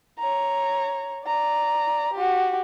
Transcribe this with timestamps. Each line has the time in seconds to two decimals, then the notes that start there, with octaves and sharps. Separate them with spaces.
0.19 C#5 A#5
1.25 D5 A#5
2.14 F#4 G4